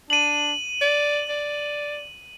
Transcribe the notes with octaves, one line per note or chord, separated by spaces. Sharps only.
D4 D#7 F#7
D5
D5